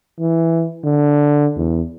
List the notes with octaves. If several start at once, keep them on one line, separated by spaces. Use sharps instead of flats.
E3
D3
E2